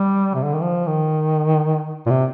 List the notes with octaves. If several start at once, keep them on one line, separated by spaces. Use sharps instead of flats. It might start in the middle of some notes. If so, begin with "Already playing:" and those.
Already playing: G3
C3
D3
D#3
F3
D#3
A#2
C3